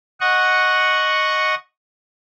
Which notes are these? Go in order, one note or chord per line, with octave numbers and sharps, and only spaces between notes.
D#5 F#5 C#6